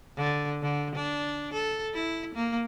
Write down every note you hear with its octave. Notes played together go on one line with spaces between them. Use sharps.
D3
D3
D4
A4
E4
A#3